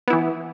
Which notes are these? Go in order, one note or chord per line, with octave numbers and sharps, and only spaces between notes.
E3 B3 E4